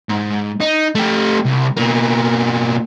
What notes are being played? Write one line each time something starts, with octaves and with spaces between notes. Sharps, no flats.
G#2
D#4
A3 G4
C2
B2 A#3